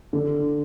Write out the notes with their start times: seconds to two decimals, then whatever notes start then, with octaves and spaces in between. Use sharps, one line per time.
0.13 D3